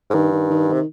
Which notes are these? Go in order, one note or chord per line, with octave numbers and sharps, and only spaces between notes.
G#2
G2 D#3
D#3
D#3
C3 D#3